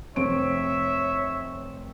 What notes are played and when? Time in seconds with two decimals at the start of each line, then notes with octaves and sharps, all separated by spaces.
0.16 F1 C4 C#5 E5 D7